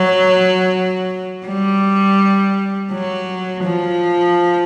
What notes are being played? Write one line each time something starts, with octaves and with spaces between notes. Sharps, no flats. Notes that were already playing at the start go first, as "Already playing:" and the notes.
Already playing: F#3
G3
F#3
F3